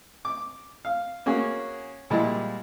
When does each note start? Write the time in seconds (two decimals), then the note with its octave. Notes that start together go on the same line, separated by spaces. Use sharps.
0.25 D6
0.85 F5
1.26 A#3 C#4 F#4 G#4
2.10 A#2 F3 G3 G#3 E4